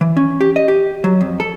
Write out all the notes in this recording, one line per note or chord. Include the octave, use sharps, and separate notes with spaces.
E3
C#4
G4
D#5
G4
F#3
F2
A4